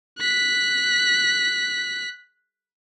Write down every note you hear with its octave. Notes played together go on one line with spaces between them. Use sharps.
F#6 B6